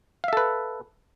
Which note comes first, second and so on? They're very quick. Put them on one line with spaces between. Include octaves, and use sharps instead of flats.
F5 E5 A4 B4